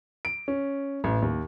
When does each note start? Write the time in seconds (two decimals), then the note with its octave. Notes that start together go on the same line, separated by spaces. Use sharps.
0.25 D7
0.48 C#4
1.04 A1
1.22 D#2